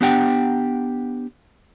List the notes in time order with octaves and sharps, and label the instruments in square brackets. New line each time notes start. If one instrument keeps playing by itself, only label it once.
[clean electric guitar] B3 D4 G4 F#5 G5